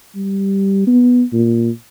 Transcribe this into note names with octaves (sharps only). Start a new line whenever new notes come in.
G3
B3
A#2